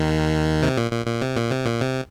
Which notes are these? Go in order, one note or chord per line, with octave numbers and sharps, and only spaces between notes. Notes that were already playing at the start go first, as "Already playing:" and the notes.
Already playing: D#2 D#3
C3
A#2
A#2
A#2
C3
A#2
C3
A#2
C3